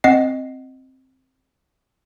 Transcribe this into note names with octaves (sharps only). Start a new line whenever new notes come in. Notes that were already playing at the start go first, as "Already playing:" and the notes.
C4 D#5 F#5 C7